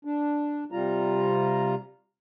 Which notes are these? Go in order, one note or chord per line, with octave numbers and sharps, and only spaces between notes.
D4
C3 G3 F4 A#5